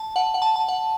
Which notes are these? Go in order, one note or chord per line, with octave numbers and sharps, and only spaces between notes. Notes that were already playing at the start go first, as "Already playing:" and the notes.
Already playing: A5
F#5
F#5
A5
A5
F#5